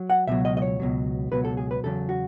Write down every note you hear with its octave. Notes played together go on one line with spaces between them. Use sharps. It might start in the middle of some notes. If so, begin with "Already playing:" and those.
Already playing: F#3
F#5
C#2 B2 F#3 E5
D#5
D#5
C#5
C#2 B2 F#3
C#2 B2 F#3 B4
A4
G#4
B4
E2 C#3 F#3 A4
F#4